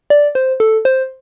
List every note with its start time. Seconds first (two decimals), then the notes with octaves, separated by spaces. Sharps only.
0.10 D5
0.35 C5
0.60 A4
0.85 C5